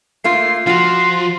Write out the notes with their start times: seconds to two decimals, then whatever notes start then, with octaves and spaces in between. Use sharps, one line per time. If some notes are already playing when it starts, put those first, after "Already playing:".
0.24 A3 A#3 F4 C7
0.67 F3 F4 F#4 C6 C7